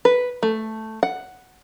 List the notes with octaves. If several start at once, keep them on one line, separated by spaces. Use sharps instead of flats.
B4
A3
F#5